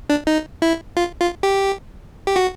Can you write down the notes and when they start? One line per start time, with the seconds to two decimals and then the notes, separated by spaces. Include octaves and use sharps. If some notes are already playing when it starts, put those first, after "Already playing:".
0.10 D4
0.27 D#4
0.62 E4
0.97 F4
1.20 F4
1.43 G4
2.27 G4
2.36 F#4